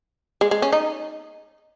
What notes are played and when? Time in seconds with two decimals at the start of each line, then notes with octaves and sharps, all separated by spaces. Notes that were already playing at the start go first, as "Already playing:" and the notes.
0.41 G#3
0.51 G#3
0.62 C#4
0.72 D#4